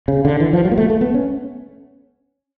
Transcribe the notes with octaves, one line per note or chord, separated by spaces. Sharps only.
C#3
D3
E3
F3
F#3
A#3
A3
A3
B3
C#4